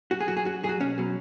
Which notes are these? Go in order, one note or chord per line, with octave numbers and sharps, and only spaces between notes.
F#2 F#4
G#4
F#3 F#4
G#4
F#2 F#4
F#3 G#4
F#4
B1 C#4
B2 F#3